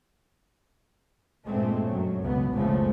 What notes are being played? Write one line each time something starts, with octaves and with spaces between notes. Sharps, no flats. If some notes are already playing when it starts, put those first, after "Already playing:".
G2 A#2 G#3 A3 C4
F#2 F#3
C#2 B2 B3
F#1 A2 C#3 F3 G#3 A3